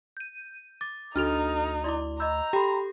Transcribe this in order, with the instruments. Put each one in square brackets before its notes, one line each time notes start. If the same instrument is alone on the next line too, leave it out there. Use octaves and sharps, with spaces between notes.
[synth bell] G6 D#7
[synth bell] D6 [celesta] A6
[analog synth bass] D2 [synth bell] D4 F#4 F7 [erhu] D#4 [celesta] A4 F6
[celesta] E4 D5 [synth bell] C6 D6
[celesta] D#5 E6 [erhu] A#5 [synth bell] B5 G6
[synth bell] G4 A4 [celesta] G5 B5 C6